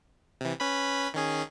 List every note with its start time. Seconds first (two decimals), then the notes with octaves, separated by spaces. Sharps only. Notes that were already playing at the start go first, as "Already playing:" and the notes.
0.41 C3 E3
0.60 C#4 B4 B5
1.14 D#3 C#4 G#4